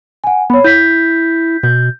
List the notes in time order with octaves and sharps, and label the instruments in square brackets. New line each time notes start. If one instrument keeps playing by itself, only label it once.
[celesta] F#5 G#5
[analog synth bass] B3 [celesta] C#5 B5
[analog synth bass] E4 [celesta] G6 B6
[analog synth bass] B2 [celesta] G6